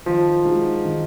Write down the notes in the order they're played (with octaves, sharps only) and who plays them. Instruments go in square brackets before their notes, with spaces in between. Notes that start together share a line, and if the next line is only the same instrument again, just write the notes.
[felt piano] D#3 [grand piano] F3
[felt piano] G#3 D#4 F#4
D#3